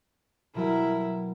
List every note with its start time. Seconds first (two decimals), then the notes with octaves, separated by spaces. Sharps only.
0.55 B2 F#3 G3 E4 A#4